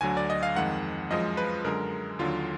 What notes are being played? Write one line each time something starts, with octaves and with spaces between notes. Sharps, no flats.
D2 D3 F#3 G#5
D5
D#5
F5
F2 D#3 G#3 F#5
F#2 F3 G#3 D#5
B4
F#2 D3 G#3 A#4
D#2 D3 F#3 F4